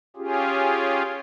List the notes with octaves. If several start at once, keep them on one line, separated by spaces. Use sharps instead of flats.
C#4 F4 G4 G#4